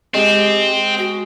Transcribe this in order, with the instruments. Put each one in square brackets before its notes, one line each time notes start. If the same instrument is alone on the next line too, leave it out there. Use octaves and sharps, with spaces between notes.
[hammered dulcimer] G#3 [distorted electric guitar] C4 [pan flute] G4
[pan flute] F#4